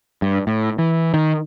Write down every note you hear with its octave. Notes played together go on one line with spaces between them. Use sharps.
G2
A2
E3
D#3